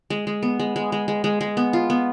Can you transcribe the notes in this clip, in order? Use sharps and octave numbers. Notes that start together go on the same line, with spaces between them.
G#3
G#3
B3
G#3
G#3
G#3
G#3
G#3
G#3
B3
F4
B3